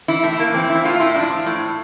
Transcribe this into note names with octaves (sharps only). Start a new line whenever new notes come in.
E3 E4
A2
A2 A#3
E3 C4
E3 E4
A2 F4
A2 E4
F3 D4
F3
A2